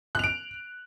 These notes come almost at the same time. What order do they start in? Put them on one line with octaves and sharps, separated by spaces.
F#6 F7 D7